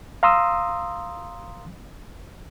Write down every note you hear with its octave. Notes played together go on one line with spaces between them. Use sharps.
F5 A#5 C6 D#6 E6